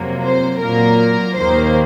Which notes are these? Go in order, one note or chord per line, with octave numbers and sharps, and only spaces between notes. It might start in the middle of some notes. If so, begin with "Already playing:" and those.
Already playing: F2 C3 F#3 A#3
C5
A#2 F#3 A#3 A#4
D#2 D#3 A#3 C5